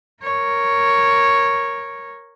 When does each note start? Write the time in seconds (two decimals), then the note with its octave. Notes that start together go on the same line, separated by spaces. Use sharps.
0.23 A#4 C#5